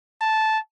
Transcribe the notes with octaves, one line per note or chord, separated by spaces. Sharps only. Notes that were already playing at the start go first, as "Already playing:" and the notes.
A5